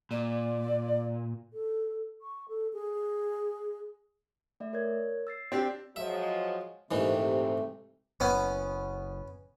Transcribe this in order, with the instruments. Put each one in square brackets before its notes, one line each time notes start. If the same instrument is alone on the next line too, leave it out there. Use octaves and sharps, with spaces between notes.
[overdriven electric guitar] A#2 [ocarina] D5
[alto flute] A4
C#6
A4
G#4
[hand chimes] A3 D5 E5
A#4 C#5 G#6
E6 A6 C7
[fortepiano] C4 D4 G4 [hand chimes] C5
[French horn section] F3 F#3 G#3 [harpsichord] E5
[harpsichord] A#1 G#2 E3 [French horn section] C3 [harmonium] A3
[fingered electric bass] F#1 [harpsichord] B3 C#4